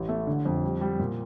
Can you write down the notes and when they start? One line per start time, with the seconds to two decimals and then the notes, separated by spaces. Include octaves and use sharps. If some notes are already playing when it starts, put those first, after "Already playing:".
Already playing: A1
0.09 A3
0.27 D3
0.45 F2
0.64 G3
0.81 G3
0.99 A#2